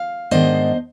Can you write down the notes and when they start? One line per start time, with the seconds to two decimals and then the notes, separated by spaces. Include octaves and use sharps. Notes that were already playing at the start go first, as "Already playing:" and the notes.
Already playing: F5
0.31 G#2 D#3 B3 D4 C5 D#5